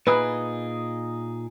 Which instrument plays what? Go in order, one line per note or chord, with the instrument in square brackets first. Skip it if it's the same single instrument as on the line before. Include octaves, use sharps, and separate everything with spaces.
[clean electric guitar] A#2 D#4 G#4 [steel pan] B4